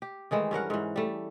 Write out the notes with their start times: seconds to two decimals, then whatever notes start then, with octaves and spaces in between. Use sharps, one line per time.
0.02 G4
0.31 D#3 E3 G#3 A3
0.51 G2 C#4 A#4 F#5
0.70 G#2 E3
0.96 G3 A3